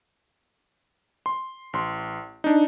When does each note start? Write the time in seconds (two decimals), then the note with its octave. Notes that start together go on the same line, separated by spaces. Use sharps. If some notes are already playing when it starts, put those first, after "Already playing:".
1.26 C6
1.73 A1 C6
2.44 D4 D#4